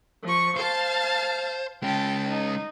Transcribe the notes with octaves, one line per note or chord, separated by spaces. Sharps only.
F3 C#6
C5 F5 A5
G#3 C#4 G5 A5
D#4